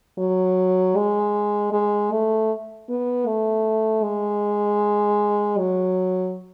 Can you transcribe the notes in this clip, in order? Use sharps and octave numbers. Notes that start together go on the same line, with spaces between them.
F#3
G#3
G#3
A3
B3
A3
G#3
F#3